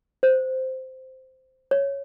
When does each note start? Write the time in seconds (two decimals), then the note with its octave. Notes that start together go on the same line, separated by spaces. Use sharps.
0.23 C5
1.71 C#5